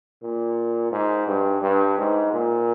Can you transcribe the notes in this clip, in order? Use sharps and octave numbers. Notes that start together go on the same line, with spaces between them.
A#2
G#2
G2
G2
G#2
A#2